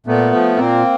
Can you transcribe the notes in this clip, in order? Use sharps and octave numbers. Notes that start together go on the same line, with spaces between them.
A#2 A3 B3
F3
A#2 A#3 C4